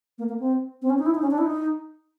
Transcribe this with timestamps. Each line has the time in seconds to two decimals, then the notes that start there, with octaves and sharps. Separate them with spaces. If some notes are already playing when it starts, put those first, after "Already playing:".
0.18 A#3
0.29 A#3
0.40 C4
0.82 C4
0.90 C#4
0.99 D#4
1.06 E4
1.15 D#4
1.22 C#4
1.31 D4
1.38 E4
1.46 D#4